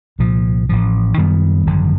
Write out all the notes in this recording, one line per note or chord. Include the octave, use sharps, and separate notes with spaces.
C2 A#2 F3
A1 A2 F3
F#2 D#3 G3 B3
G#1 F#2 D3 F3